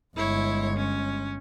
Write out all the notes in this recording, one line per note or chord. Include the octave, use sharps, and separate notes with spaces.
G1 G#3 E4 C#5
C#4